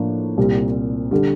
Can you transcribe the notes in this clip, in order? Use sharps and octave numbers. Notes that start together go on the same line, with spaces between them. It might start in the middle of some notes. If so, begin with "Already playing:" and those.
Already playing: A2 F3 A#3 D4
C2 A#2 G3 C4
D3 G3